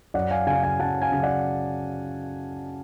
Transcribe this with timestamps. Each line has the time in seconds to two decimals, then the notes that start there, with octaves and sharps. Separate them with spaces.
0.14 F#2 D5 F#5
0.30 F5 G#5
0.47 C#3 F#3 F5 G#5
0.63 F5 G#5
0.80 F#2 F#5 A5
1.02 F5 G#5
1.12 C#3 F#3
1.23 D5 F#5